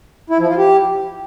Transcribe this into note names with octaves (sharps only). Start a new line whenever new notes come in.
E4
F3
F4
G4